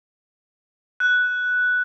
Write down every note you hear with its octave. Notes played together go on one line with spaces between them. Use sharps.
F#6